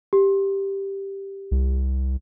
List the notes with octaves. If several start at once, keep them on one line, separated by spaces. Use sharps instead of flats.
G4
C2